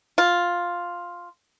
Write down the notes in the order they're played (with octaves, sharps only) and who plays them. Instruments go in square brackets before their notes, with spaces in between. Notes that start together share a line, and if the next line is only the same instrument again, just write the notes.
[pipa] F4